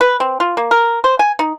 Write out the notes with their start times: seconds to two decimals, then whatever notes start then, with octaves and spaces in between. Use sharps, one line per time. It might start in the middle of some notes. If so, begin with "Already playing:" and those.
0.01 B4
0.20 C4
0.40 F4
0.57 A#3
0.71 A#4
1.04 C5
1.19 G#5
1.39 D#4